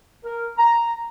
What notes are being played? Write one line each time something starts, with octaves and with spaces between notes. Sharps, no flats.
A#4
A#5